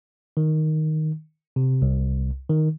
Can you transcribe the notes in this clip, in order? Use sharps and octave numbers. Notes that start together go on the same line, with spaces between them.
D#3
C3
C2
D#3